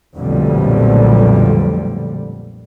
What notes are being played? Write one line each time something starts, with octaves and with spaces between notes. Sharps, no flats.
B1 F2 A#2 D3 G3 A3